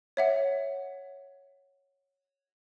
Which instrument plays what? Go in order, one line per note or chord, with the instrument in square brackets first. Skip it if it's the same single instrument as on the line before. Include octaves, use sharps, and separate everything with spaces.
[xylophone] C#5 E5 F#5